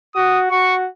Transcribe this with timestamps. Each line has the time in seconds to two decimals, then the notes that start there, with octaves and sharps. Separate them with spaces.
0.15 F#4 D#6
0.51 F#4 C#6